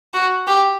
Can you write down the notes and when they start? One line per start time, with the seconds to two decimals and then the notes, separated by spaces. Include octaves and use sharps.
0.14 F#4
0.47 G4